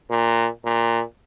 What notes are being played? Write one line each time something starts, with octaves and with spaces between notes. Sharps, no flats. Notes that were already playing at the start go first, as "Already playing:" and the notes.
A#2
A#2